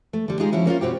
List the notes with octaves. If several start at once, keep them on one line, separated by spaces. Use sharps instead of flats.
A3
D3 G3
G#3 D#4 F4 G4 G#4
F3 C#4 E4 F#4
A#3 C#4 D#4 F4
B2 C4 F#4 G4